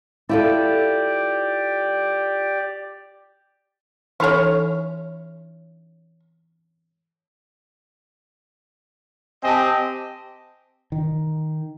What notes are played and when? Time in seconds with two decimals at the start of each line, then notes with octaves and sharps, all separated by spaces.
0.29 E4 F4 G4 A4 D5
4.20 E3 C#4 D#4 E4 A4 C#5 C6 F6
9.43 C4 G4 D#5 G#5 A5
10.92 D#3